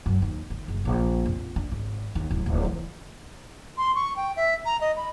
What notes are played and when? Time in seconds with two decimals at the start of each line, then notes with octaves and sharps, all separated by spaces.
0.06 F#2
0.22 D#2
0.50 D#3
0.68 F#1
0.85 A#1
1.26 F2
1.56 D4
1.72 G#1
2.15 D#2
2.31 D1
2.46 D1
2.65 E3
3.77 C6
3.95 C#6
4.16 G5
4.36 E5
4.66 A#5
4.81 D#5
4.97 B5